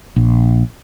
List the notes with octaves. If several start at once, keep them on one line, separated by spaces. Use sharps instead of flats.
A#1